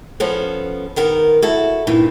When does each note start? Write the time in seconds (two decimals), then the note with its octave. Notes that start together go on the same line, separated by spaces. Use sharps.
0.20 F3 B3 C#4 A4
0.96 D#3 B3 A#4
1.42 E4 F#4 A4
1.87 G2 A#2 D#3 E3